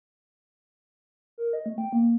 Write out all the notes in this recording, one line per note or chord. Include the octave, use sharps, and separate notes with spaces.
A#4
D#5
A3
G5
A#3